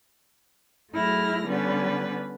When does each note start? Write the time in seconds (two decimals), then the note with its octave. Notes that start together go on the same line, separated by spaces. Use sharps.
0.94 F#3 A3 E4 G#4 F6 A#6
1.47 D3 G3 B3 C#4 B4